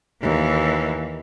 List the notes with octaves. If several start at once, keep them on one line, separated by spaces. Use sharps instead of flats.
D#2 E3